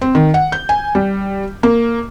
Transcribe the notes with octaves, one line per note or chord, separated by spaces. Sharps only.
C4
D#3
F#5
G6
G#5
G3
A#3